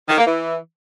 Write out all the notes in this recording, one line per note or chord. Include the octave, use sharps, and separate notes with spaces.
D#3
A#3
E3